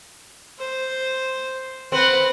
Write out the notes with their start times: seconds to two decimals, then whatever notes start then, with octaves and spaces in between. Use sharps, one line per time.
0.59 C5
1.92 C4 B4 F#5